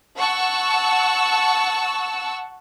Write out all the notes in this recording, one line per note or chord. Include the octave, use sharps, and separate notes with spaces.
F#5 A5 C#6 E6